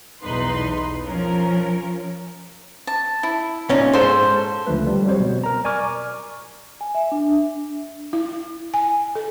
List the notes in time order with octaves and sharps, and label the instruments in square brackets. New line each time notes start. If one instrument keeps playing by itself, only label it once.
[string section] B1 E2 D#4 B4 C6
F3 C#4 A#4
[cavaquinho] A5
E4
[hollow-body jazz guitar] A#2 C#4 D#4
[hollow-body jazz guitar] G#2 [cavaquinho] A4 C5 C6
[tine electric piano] C#2 D3 F3 A3 B4
G3
F#3 G3 C4 C5 C#5
B2
A#4 A#5
D5 G#5 C#6 D6 F6
[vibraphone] G#5
E5
D4
[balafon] E4
G#5
A4